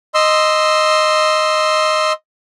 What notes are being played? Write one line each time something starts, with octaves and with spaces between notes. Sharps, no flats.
D#5 C6 E6